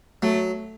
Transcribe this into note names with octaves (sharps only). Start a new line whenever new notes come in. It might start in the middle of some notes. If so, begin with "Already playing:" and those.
F#3 A3